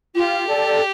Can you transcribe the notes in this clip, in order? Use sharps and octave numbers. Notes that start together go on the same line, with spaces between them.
F4 G4
A4 D5